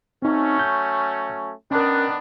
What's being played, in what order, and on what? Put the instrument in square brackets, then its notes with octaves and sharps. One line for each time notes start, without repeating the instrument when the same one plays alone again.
[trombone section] F#3 A3 C#4 [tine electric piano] C4 D#4
[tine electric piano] G6
[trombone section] D#3 B3 D4 [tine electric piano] C#4 A#4